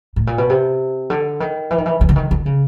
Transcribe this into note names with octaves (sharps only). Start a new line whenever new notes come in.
A2
A#2
B2
C3
D3
D#3
E3
D#3
E3
D#3
D3
D#3
D3
C#3